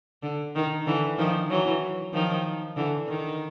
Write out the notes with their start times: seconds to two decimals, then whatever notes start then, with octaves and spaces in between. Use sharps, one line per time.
0.23 D3
0.55 D#3
0.86 D3 E3
1.18 D#3 F3
1.50 E3 F#3
2.13 D#3 F3
2.76 D3 E3
3.08 D#3